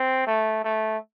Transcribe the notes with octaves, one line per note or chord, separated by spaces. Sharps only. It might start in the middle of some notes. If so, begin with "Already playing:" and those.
Already playing: C4
A3
A3